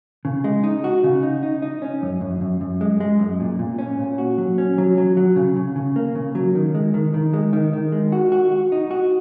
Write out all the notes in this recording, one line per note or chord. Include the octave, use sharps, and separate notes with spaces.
C#3
G#3
D#4
F#4
C#3
D#4
D#4
D#4
C#4
F#2
F#2
F#2
F#2
G#3
G#3
F#2
A#2
A#2
C#4
A#2
F#4
F#3
C#4
F#3
F#3
F#3
C#3
C#3
C#3
A#3
C#3
F#3
D#3
G#3
D#3
D#3
G#3
D#3
D#3
G#3
F#4
F#4
F#4
D#4
F#4